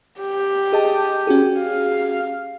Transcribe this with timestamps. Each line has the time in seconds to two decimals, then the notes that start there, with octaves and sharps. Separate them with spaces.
0.21 G4
0.73 G#4 D#5 A5
1.27 C#4 F#4 G#4
1.59 F5